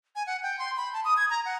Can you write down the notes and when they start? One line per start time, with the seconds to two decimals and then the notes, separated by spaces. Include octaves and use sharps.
0.16 G#5
0.27 F#5
0.43 G5
0.59 C6
0.77 B5
0.93 A5
1.05 D#6
1.17 G#6
1.30 A#5
1.45 F#5